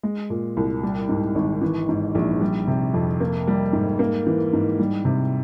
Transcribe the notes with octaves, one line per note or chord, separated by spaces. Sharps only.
G#3
A#2
C2
G3
G#2
G#1
E3
G#2
A#1
G3
C3
F2
A#3
G3
G#2
A#3
E3
G#2
G3
C3